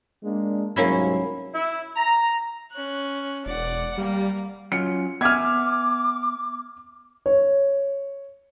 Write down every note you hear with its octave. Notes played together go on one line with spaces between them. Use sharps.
G#3 A#3 D4
C2 G#2 F#3 A#3 C#4 E4
E4
A#5
C#4 F#6
E1 D5 F#5
G3 A#3
F#3 C#4 F4 C#7
B3 E5 G#5 D6 F6 G#6
C#5